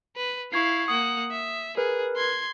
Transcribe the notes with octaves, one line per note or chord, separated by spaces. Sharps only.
B4
E4 F5 C#6 G#6 C7
A#3 F#5 D#6
E5
G#4 A#4 B4
C6 G#6